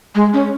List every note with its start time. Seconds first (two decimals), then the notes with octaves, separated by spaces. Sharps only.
0.15 G#3
0.33 C#4